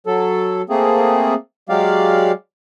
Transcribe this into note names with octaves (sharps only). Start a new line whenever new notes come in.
F#3 A4
A3 A#3 C4 G#4
F#3 G#3 G4 D5 F5